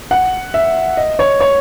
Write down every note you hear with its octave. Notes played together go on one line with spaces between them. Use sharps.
F#5
E5
D#5
C#5
C#5